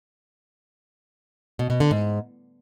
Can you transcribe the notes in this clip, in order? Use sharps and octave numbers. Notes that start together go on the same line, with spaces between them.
B2
B2
D3
G#2